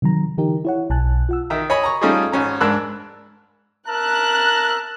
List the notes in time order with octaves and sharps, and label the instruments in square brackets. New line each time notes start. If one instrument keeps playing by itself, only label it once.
[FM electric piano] C3 D#3 F#3 A#5
D3 E3 D#4 G4 A#4
E4 C#5 F#5
B1 G#5 A5 F#6
F4 F#5 E6
[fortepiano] D#3 E5 A#5
C#5 D#5 G#5 B5
A#5 C#6
G3 A3 C#4 D#4 F4 G#4
G#1 C#4 A#5
G#2 D4 A#4 B5 E6 F#6
[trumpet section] A#4 E5 A5 [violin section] F#6